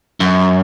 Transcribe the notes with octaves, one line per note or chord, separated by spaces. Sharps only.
F#2